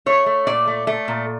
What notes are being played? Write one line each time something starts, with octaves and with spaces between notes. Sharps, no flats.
A3 C#5
A3
A#2 D5
A3
A3
A#2